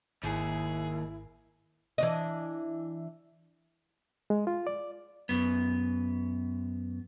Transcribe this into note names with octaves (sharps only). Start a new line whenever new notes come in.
G#1 D#2 E4 G#4
E3 D4 D#5
G#3
F4
D5
F#2 B3